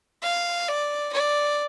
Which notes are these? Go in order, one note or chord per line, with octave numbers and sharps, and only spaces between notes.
F5
D5
D5